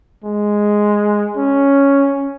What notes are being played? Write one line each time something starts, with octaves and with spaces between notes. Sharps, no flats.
G#3
C#4